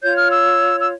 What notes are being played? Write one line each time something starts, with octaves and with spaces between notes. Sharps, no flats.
F4 C#5 G6
F6
E6
E6